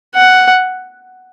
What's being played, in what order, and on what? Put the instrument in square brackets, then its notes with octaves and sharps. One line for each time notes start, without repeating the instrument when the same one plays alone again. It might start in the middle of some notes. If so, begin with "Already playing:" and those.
[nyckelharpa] F#5